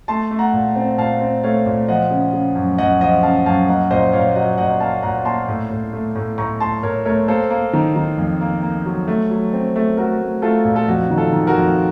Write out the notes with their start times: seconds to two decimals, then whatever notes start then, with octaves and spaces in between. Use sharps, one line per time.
0.08 A3 A5 C6
0.31 A3
0.39 F#5 A#5
0.53 A#2
0.76 C4
0.98 A#2 F5 A5
1.21 C4
1.44 A3 C#5 F5
1.66 A#2
1.88 F3 D#5 F#5
2.11 C#3
2.33 C#3
2.55 F#2
2.78 F#2 D#5 F#5
3.01 F3 D#5 F#5
3.23 C#3 F5 A5
3.46 F#2 F5 A5
3.68 A#3 D#5 F#5
3.91 A#2 C5 D#5
4.13 A#2 C#5 F5
4.36 F#3 D#5 F#5
4.58 A#2 D#5 F#5
4.80 A#3 F5 A5
5.03 A#2 F#5 A#5
5.25 A#3 A5 C6
5.48 A2
5.70 A2
5.93 A3
6.16 A2
6.38 A2 A#5 C#6
6.60 A2 A5 C6
6.83 A2 A#4 C#5
7.05 A3 A#4 C#5
7.28 A#3 A4 C5
7.50 A#3
7.73 D#3
7.96 D#3
8.18 F2
8.41 A#3
8.62 A#3
8.86 F#3
9.08 A3
9.30 F#3
9.53 C4
9.76 A3
9.97 A3 F#4 A#4
10.21 A3
10.42 A3 F4 A4
10.65 A#2
10.76 A4
10.88 F2 F#4
11.10 D#3
11.18 F4 A4
11.32 D#3
11.47 F#4 A#4
11.55 F2